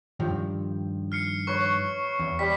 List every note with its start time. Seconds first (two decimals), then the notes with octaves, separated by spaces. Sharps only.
0.20 G2 D#3 F3
1.12 F6 C7 C#7
1.47 B4 C#5 C#6
2.19 E2
2.39 G3 B6